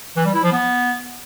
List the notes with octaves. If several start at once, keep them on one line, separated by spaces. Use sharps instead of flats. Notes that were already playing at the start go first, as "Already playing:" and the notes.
E3
G3
E4
F3
B3